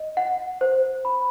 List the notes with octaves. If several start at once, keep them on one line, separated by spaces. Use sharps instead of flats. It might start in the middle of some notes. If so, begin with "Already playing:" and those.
Already playing: D#5
F#5
C5
B5